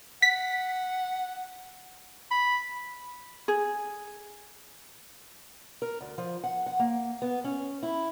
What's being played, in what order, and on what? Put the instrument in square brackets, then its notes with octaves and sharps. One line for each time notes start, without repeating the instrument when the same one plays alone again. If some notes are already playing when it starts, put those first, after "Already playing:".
[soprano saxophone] F#5 [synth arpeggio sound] B6
[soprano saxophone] B5
[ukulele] G#4
[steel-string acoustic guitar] A#4
D2
F3
F#5
F#5
A#3
B3
C#4
E4